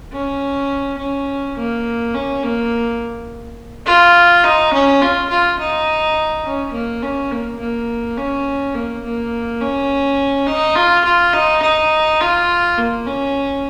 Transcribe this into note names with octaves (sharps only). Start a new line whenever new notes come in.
C#4
C#4
A#3
C#4
A#3
F4
D#4
C#4
F4
F4
D#4
C#4
A#3
C#4
A#3
A#3
C#4
A#3
A#3
C#4
D#4
F4
F4
D#4
D#4
F4
A#3
C#4